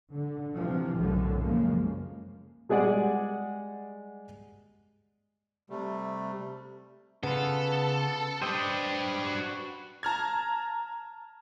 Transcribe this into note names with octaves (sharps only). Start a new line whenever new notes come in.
D3
C3 E3 F3
B1 F#2 A2 D3
F#2 C#3 F3 G#3 A#3
G3 G#3 G#4 D5 F#5
C3 G3 A3
C#3 B3 F4 A4
D4 G4 B4 C5 D#5 G5
F#4
A5 A#5 F6 G#6